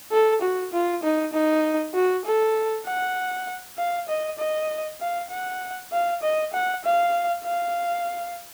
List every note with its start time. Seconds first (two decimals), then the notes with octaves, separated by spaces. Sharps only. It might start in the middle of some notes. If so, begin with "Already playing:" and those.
0.11 A4
0.42 F#4
0.73 F4
1.03 D#4
1.33 D#4
1.94 F#4
2.25 A4
2.86 F#5
3.78 F5
4.09 D#5
4.38 D#5
5.01 F5
5.30 F#5
5.92 F5
6.23 D#5
6.53 F#5
6.84 F5
7.44 F5